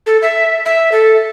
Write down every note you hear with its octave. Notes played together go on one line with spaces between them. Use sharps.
A4
E5
E5
A4